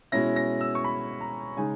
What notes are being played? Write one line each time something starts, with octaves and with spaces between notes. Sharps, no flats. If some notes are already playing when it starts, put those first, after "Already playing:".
B2 G#3 C#4 E4 A#6
A#6
E6
C#6
B5
A#5
C#3 G#3 D#4 G#5